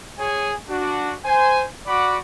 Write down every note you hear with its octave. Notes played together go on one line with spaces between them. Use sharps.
G#4 C#5 G#5
D4 F#4
C5 G#5
F#4 D5 F#5 B5 D6